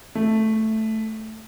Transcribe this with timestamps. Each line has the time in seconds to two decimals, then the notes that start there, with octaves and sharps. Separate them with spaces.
0.15 A3